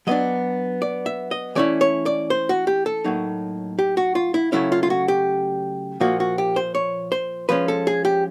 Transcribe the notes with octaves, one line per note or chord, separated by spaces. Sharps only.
F#3 B3 D4 D#5
D5
E5
D#5
E3 A3 C#4 E4 D5
C#5
D5
C5
F#4
G4
A4
A2 F#3 A#3 D#4
G4
F#4
F4
E4
C#3 F#3 A3 C#4 E4
F4
F4
F#4
G4
A#2 F3 A#3 F#4
F#4
G4
C5
C#5
C5
F3 G#3 C#4 B4
A4
G#4
G4